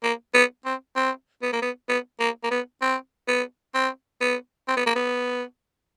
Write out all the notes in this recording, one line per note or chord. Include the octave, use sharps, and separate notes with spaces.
A#3
B3
C4
C4
B3
A#3
B3
B3
A#3
A#3
B3
C4
B3
C4
B3
C4
B3
A#3
B3